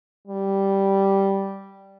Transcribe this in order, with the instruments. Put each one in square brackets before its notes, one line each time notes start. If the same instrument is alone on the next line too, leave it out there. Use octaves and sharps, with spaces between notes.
[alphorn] G3